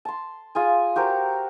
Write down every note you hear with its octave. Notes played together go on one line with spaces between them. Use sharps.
A5 C6
F4 G#4 G#5
F#4 G4 A#4 C5